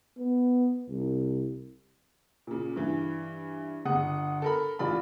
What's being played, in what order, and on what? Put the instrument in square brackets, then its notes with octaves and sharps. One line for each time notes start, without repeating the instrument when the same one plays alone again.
[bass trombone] B3
C2
[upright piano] A#2 C#3
G2 E3
G1 F#5 D#6
A4 A#4 B5
A1 F4 D5 B5